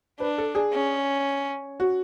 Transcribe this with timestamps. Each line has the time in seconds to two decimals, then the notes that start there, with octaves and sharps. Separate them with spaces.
0.20 D4 B4
0.38 A4
0.55 G#4
0.73 C#4
1.80 F#4